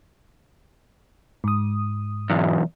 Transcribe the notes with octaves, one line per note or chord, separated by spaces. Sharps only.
G#2 D#6
B1 E2